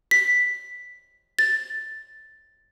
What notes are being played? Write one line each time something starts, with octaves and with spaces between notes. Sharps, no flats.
B6
A6